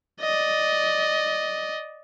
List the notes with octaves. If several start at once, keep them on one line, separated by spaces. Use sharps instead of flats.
D5 D#5